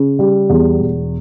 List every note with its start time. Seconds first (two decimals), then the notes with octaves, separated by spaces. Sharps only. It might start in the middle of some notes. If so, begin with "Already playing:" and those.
Already playing: C#3
0.19 G3
0.49 E2
0.80 E1